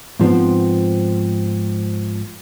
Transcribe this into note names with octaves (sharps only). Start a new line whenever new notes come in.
G#2 F3 B3 C4